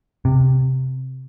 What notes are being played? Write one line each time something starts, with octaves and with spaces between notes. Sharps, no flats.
C3